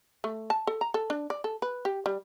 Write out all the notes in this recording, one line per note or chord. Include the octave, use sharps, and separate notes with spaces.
A3
A5
A4
A#5
A4
D4
D5
A4
B4
G4
G3